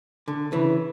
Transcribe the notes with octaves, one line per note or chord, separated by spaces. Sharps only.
D3
C#3 E3